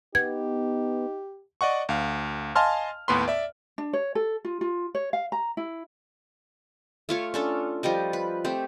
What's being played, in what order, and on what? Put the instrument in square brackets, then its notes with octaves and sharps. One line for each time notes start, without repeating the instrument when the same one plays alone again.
[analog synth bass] B3 [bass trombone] D#4 [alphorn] G4 [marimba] G#6
[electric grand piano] D5 D#5 F#5 C#6
D2 F5
D#5 F5 G#5 A5 C6 F6
D#2 A2 B3 B4 B5 C6
D5 E5
[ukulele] D4
C#5
A4
F4
F4
C#5
F5
A#5
E4
[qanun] A3 F4 C#5
C#4 D4 A4
F3 G3 G4 D#5
B4
A3 C4 G4